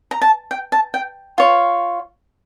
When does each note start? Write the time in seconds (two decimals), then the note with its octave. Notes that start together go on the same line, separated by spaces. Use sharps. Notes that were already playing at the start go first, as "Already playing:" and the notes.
0.11 A#5
0.21 A5
0.51 G5
0.72 A5
0.94 G5
1.38 F4 C#5